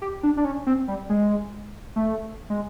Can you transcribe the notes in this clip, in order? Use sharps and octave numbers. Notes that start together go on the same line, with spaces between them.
G4
D4
D4
C#4
C4
G3
G#3
A3
G#3